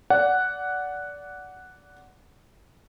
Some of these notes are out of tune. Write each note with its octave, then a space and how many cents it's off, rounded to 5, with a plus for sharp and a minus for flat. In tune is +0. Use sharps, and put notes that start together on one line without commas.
D5 -20 F#5 +0